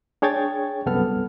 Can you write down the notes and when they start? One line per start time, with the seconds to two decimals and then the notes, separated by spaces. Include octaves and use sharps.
0.22 D4 G#4 C#5 G5 G#6 A6
0.86 C2 F#2 B3 A4 F6